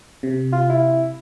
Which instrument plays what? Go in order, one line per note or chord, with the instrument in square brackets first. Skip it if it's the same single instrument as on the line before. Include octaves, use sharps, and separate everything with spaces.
[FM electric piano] C3
[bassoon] F4
E4